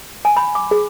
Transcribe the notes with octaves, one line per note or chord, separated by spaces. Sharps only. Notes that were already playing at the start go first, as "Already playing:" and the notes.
G#5
B5
D6
G#4